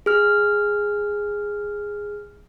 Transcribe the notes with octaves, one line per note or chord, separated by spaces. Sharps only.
G#4 F6